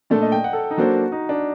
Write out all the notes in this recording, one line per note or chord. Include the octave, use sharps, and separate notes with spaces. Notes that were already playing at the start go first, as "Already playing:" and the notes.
A#2 A3 D4 A4 D5
D#5
G5
F#5
A4
D#4
F#3 A#3 D4 F#4 A4 C5
D#4
D4